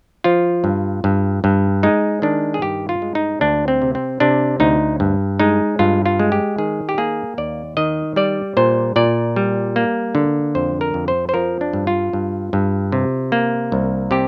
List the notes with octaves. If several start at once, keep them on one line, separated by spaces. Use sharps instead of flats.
F3 F4
G2
G2
G2
G#3 D#4
D#3 D4
G#4
G2 G4
F4
G#3
D#4
D2 D4
C4
C3
C4
C3 D4
D2 D#4
G2
G#3 D#4
G2 F4
F4
G#3
G4
D#3 G#4
G4
A#3 G#4
D#2 D5
D#3 D#5
G3 D5
A#2 C5
A#2 D5
G3
A#3
D3
F2 C5
A#4
F2
C5
C5
F3 A#4
D4
G2
F4
G2
G2
C3
A#3
C2
C3 G4